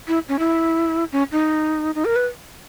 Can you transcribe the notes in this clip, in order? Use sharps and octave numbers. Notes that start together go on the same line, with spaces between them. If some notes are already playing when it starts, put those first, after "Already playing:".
E4
C#4
E4
C#4
D#4
D#4
A#4
B4